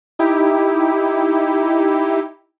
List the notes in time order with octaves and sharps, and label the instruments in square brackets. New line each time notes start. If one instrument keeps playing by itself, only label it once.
[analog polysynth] D#4 E4 G4